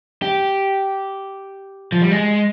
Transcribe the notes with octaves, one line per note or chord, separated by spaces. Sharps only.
G4
F3
G3
G#3